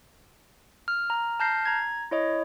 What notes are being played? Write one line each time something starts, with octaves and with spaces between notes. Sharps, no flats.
F6
A#5 F6
A5 F6 G6 A#6 C7
A#5 G#6
E4 C#5 D#5